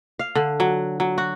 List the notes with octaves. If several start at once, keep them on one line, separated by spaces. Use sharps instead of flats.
F5
D3
F#3
F#3
F#4